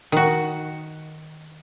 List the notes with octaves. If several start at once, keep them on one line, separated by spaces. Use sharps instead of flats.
D#3 F#4